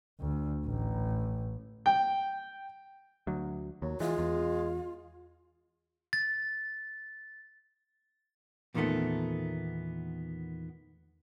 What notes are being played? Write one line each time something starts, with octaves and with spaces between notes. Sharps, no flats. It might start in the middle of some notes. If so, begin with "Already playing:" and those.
D2
A1
G5
D2 F#3
D#2 F#3
E3 G#3 F4
E2
A6
E2 A#2 D#3 G3 A3 B3